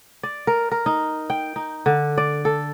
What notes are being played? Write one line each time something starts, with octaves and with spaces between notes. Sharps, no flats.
D5
A#4
A#4
D#4
G5
D#4
D3
D5
A4